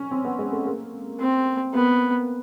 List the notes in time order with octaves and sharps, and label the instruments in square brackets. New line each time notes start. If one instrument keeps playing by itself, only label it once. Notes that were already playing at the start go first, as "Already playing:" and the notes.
Already playing: [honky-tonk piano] C#4
C4
B3
G#3
A3
A#3
[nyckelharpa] C4
[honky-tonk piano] A#3 [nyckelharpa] B3